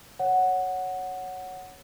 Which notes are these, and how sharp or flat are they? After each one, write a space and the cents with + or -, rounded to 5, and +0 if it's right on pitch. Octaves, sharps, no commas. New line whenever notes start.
C#5 +0 F#5 +0